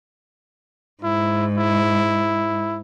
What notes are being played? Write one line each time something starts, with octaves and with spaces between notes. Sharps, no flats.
G#2 E4
E4